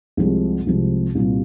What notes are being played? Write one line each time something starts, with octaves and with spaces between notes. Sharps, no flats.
C2 C3 F3 G#3
C2 C3 F3 G#3
C2 A#2 G3 A#3